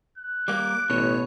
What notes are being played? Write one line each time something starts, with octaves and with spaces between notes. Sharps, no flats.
F#6
G3 A#3 D6
A1 B2 C#5